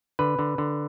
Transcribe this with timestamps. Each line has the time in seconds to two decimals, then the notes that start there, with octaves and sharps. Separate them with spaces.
0.19 D3 B4
0.39 D3
0.58 D3